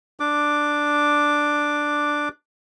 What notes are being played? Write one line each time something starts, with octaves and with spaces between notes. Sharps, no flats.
D4 D6